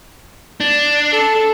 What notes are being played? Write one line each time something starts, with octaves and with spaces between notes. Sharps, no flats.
D4
A4